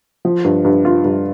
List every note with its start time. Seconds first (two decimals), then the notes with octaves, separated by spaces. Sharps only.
0.25 F3
0.45 G2
0.65 G2
0.85 F4
1.04 G2